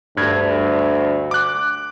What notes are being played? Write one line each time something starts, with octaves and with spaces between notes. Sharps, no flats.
D2 G2 G#6
D6 F#6